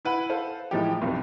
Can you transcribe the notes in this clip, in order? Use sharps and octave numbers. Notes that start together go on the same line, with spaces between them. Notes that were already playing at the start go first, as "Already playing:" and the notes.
E4 B4 F#5
A4 C5 F5
A2 E3 F3 G#3 D#4 G4
B1 G2 C3